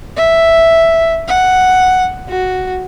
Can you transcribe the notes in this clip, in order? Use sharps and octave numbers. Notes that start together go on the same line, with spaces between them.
E5
F#5
F#4